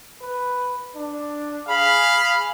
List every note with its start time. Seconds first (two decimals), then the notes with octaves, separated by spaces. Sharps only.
0.21 B4
0.95 D4
1.68 G#4 F5 B5